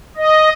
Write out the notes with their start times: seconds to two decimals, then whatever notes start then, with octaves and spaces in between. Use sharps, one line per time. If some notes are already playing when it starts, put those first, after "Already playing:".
0.17 D#5